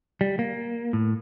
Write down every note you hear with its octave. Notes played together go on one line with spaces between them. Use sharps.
G3
A#3
A2